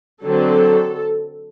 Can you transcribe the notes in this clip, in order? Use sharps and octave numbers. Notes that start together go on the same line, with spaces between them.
D3 F#3 C4 A4